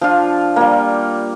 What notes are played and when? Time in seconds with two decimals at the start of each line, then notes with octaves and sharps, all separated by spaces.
0.01 F3 D4 F4
0.56 G3 A#3